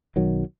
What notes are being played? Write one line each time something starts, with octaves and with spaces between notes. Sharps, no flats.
B1 D#3 F#3